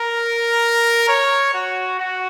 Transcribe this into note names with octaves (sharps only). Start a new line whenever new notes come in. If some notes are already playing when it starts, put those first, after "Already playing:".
Already playing: A#4
C#5
F#4
F#4